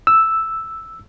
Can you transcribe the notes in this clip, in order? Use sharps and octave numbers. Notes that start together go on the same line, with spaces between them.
E6